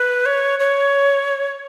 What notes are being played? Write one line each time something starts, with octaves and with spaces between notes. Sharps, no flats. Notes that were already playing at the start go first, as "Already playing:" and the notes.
Already playing: B4
C#5
C#5